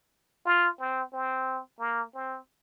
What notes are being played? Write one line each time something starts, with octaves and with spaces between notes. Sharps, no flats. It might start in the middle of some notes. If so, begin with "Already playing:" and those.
F4
C4
C4
A#3
C4